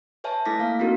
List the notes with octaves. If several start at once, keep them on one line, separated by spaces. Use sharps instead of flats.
B4 C#5 E5 G#5 A5
A3 E4 A4 D6 A#6 B6
A#3 F5
C4 D#4 E4 F#4 A#4